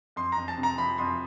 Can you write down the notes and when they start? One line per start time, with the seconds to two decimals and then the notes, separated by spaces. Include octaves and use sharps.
0.16 F2 C6
0.32 F2 A#5
0.48 A5
0.58 C3
0.63 A#5
0.78 F3 B5
0.98 F2 C6